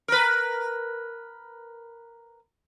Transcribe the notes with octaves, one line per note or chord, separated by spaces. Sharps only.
A#4 B4